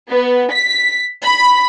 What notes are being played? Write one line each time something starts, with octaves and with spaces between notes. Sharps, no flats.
B3
B6
B5